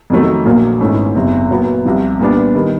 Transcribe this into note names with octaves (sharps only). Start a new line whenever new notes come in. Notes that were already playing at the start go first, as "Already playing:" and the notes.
F2 C3 D#3 F#3 A3
A#1 A#2 F#3 A#3
G#1 G#2 E3 A3 C#4
F#1 E2 C3
A#2 F#3 B3
C2 C3 F3
A#2 G3 B3 D4
D#3 G3